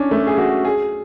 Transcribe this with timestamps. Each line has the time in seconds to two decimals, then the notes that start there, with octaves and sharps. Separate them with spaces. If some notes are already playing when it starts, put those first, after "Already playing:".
Already playing: C#4 D4
0.11 A3
0.27 G#4
0.38 F#4
0.65 G#4